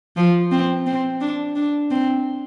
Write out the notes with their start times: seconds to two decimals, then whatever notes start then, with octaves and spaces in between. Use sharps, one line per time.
0.17 F3
0.51 C4
0.86 C4
1.21 D4
1.56 D4
1.91 C4